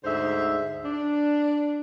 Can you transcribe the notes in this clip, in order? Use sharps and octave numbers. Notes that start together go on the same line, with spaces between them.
D2 G#2 D3 C5 E5
D4